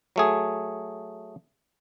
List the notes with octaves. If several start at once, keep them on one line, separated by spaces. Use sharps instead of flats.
F#3 A3 G#4